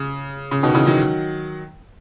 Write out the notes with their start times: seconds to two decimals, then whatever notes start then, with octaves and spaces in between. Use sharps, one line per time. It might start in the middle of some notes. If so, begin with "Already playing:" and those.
Already playing: C#3
0.51 C#3
0.63 B2 D#3
0.74 C#3 E3
0.86 D#3 F#3